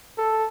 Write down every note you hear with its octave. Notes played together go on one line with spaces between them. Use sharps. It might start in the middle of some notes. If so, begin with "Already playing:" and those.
A4